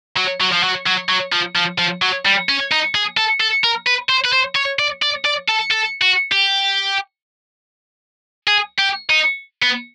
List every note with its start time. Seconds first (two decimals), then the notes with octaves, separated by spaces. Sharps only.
0.17 F#3
0.41 F#3
0.52 F3
0.64 F#3
0.87 F#3
1.09 F#3
1.33 F3
1.56 F3
1.79 F3
2.02 F#3
2.25 G3
2.49 C#4
2.71 D#4
2.95 G#4
3.17 A4
3.40 A4
3.64 A#4
3.87 B4
4.09 C5
4.25 B4
4.32 C5
4.55 C#5
4.79 D5
5.02 D5
5.25 D5
5.48 A4
5.71 A4
6.02 F#4
6.32 G4
8.47 G#4
8.78 G4
9.09 D#4
9.63 B3